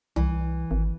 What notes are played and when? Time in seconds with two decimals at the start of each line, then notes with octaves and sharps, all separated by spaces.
0.16 C2 E3
0.71 G#1